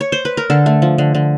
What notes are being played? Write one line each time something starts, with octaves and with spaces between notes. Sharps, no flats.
C#5
C5
B4
A#4
D3 A4
A3
F3
D3
D3